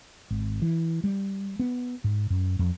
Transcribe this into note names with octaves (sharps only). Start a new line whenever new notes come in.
G#1
E3
G3
B3
G#2
F#2
F2